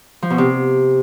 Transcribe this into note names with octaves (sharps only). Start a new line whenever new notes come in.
F3
B2
C3